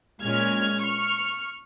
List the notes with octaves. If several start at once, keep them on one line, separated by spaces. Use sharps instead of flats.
A#2 G#3 C#4 F6 G#6
C#6 F6